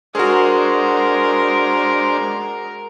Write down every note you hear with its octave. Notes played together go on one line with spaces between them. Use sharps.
G#3 D4 F#4 G#4 A#4 C5